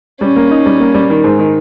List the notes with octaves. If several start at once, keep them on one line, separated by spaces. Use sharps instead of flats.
G3 C#4
A#3
D#4
G3
A#3
G3
D#3
G#2
D#3